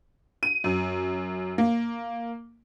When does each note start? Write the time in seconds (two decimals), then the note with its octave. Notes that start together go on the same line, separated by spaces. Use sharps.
0.43 D#7
0.64 F#2
1.58 A#3